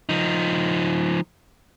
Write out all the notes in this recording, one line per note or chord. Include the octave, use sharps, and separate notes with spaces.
F3 D#4